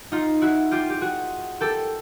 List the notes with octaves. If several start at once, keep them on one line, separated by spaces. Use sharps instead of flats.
D#4 F4
E4 F#4
F4 G4
G4
F#4 G#4
G4 A4